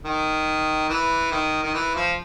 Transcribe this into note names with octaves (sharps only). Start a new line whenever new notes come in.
D#3
E3
D#3
D#3
E3
F3